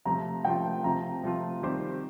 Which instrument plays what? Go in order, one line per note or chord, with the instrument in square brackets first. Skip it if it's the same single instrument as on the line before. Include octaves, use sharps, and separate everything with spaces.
[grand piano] C3 F3 A3 C4 F4 [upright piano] A#5
[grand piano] C3 F3 A3 C4 F4 [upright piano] G5
[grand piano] C3 F3 A3 C4 F4 [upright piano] A#5
[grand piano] C3 F3 A3 C4 F4
D#3 G3 C4 G4 C5